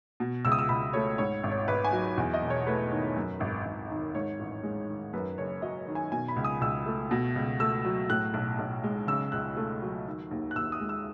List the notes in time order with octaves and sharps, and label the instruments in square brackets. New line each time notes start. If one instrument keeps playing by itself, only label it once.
[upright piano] B2
C#2 E6
D#6
E6
C#2 B5
A3 C#5
G#2 C#5
G#1
C#5
G#1 B4
G#5
F#3
E2
D#5
E1
C#5
A3 B4
D#3
F#2
G#1
G#1
D#3
G#2 C#5
A1
G#3
D#3
F#2 B4
F#1 C#5
F#3 D#5
D#3
G#5
B2 G#5
B5
C#2
D#6
C#2 E6
A3
B2
C#2
A3 E6
F#3
A2 F#6
B1
B1
G#3
C#3 E6
C#2 F#6
A3
F#3
D#3
D#2
F#6
D#2 E6
D#6
G#3
E6